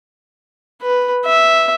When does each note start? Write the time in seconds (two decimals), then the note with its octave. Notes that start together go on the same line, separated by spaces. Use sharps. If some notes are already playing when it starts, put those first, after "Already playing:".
0.82 B4
1.25 E5